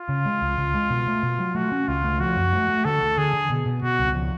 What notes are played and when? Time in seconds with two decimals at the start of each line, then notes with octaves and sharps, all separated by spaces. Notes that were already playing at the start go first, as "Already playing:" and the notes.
Already playing: F4
0.09 C#3
0.25 G#3
0.41 C#2
0.58 C#2
0.75 G#3
0.90 B2
1.07 A3
1.23 B2
1.39 F#3
1.55 A3 F#4
1.72 C#4
1.88 C#2 F4
2.04 A3
2.20 F3 F#4
2.36 F#2
2.53 A3
2.69 A3
2.85 D3 A4
3.01 D2
3.18 D3 G#4
3.34 D3
3.50 B2
3.66 B2
3.82 B2 F#4
3.99 C#2
4.15 F3